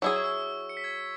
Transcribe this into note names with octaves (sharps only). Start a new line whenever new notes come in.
F#3 E4 G#4 E6
C#6
E6
C#7
B6
G#6
B6